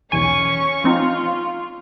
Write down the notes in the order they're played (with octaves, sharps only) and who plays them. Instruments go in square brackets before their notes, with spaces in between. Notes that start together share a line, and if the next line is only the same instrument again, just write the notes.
[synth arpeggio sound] B1 E2 G#5 [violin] C#4 C#6
[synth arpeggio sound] F3 C4 D#4 [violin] F4